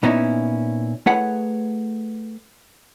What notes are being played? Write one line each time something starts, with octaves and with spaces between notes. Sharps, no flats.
A#2 B3 C#4 D#4 E4
A3 E4 G#4 B4 C#5 F#5